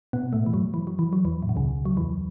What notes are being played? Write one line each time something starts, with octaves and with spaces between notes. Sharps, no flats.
B2 B3
A2 A3
E3
F#2 F#3
E3
F#3
E3
F#3
E2 E3
A2
B2
C#2 C#3
F#3
E2 E3